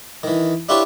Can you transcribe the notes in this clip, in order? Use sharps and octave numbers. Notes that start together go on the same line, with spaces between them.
D#3 E3
D4 E4 F4 G4 B4 C#5